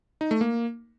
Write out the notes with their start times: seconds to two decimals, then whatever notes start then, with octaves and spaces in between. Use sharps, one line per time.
0.21 D#4
0.31 A3
0.41 A#3